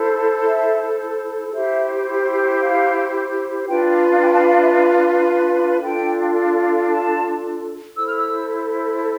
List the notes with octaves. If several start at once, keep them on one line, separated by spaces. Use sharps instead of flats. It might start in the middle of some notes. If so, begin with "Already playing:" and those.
Already playing: E4 A4 C5
E5
E4 G4 C5 E5
F5
D4 F4 B4 G5
G5
A5
F5
E5
D4 F4 A4 G5
A5
E4 A4 C5 E6
F6
E6